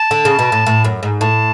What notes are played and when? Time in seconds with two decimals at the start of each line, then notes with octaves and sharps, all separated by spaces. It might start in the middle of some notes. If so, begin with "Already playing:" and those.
Already playing: A5
0.11 D3
0.25 C#3
0.39 B2
0.52 A2
0.67 A2
0.85 F#2
1.03 G#2
1.21 A2 A5